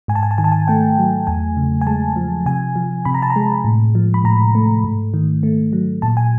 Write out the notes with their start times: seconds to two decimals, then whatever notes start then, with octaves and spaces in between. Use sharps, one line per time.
0.08 G#2 G#5
0.15 A5
0.23 G#5
0.31 A5
0.38 D#3 G#5
0.44 A5
0.52 G#5
0.68 A3 G5
0.99 F#3
1.27 E2 G#5
1.57 C#3
1.81 G#5
1.87 G#3 A5
2.16 F3
2.46 C3 G#5
2.75 F3
3.05 C3 B5
3.14 A#5
3.22 A5
3.30 A#5
3.36 G#3
3.65 A2
3.95 F3
4.14 B5
4.24 A2 A#5
4.55 A3
4.84 G#2
5.14 D#3
5.43 A3
5.73 F#3
6.02 A#2 A5
6.17 G#5